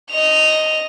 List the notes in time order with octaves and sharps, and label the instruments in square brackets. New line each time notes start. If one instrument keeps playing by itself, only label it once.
[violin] D#5 F7